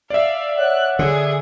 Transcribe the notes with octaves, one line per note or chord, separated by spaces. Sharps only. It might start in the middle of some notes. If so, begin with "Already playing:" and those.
D5 E5 F5
C#5 F#5 F#6
D3 G#4